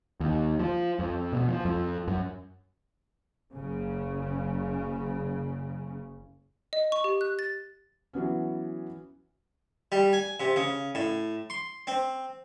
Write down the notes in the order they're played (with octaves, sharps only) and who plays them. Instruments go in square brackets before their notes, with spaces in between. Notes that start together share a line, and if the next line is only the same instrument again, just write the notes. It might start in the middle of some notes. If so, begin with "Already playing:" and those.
[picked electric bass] D#2
F3
F2
B2
F3
F2
F#2
[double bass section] F#1 C#3
[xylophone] D#5
C#6
G4
F#6
A6
[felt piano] E3 F#3 B3 C#4
[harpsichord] G3
G#5
C3
C#3
A2
C6
C4